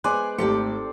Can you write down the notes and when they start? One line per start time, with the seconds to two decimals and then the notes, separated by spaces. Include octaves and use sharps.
0.04 G#3 B3 C5 D5 G#5 F#6
0.38 G#1 A3 C4 G4 A4 D5 C#7